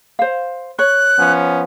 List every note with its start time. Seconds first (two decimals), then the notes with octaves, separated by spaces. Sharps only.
0.19 C5 F5
0.79 C#5 F#6
1.19 F3 B3 C#4